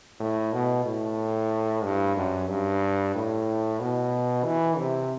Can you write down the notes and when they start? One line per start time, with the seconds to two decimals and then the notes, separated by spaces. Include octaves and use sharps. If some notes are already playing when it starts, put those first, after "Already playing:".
0.20 A2
0.53 B2
0.85 A2
1.84 G2
2.17 F#2
2.49 G2
3.15 A2
3.80 B2
4.45 E3
4.78 C3